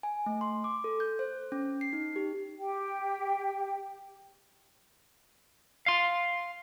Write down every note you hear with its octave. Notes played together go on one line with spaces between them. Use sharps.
G#5
A3
C6
D6
A4
G6
C5
C#4
C7
D#4
G4
G4 G5
F5 C6